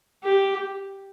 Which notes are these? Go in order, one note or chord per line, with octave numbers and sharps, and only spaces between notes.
G4